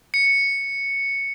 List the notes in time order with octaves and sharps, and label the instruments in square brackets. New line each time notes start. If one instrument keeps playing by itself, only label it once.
[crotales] C#7